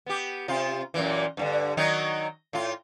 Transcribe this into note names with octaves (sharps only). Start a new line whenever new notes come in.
B3 G4
C3 F4
F#2 A#2 E3
G2 A#2 D3
D#3 F#3 D#4
A2 F4